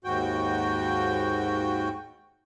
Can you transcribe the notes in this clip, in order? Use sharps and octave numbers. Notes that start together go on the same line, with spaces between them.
D#2 G#2 F#4 G5